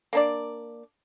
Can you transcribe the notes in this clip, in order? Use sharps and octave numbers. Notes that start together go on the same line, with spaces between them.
A#3 D4 D5